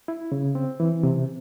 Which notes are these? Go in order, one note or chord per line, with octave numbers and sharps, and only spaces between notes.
E4
C#3
C4
E3
C3